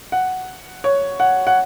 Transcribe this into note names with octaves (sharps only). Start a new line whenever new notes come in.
F#5
C#5
F#5
F#5